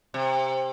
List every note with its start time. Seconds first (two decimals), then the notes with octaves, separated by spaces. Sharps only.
0.14 C3